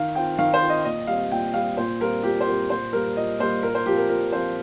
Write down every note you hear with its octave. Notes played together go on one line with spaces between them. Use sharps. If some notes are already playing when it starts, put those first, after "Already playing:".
Already playing: D#3 F5
C4 F4 G5
D#3 F5
C5
C4 F4
D#5
A#2 D#5
G3 C4 F5
A#2 G5
G3 C4 F5
A#2 C5
G3 C4 F4 A#4
A#2 G4
C5
G3 C4 F4 A#4
A#2 C5
G3 A#3 A#4
A#2 D#5
G3 A#3 C5
A#2 A#4
C5
F3 C4 F4 G4
A#4
A#2 A#4
F3 C4 F4 C5